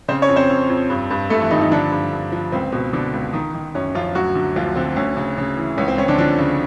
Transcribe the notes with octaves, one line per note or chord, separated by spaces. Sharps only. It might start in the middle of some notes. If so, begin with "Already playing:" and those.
C#3 C4 C5
C#4 C#5
F2
C4 C5
F2
F2
G2
G2
G2 A3 A4
E3 E4
G2 D#3 D#4
D#3 D#4
D3 F3 D4
G2
G2
F3
C#2 C4
B2
B2 D3 D4
C#2
D#3
D#3
F#2 C#4
F#2 F3 F4
D2 F#3 F#4
D3
D2 F3 F4
D3 C4
D2 C#4
C#3
C#3
E3
C#2 C#4
C4
C#2 C#4
D3 D4
D3 F3 D4
C#3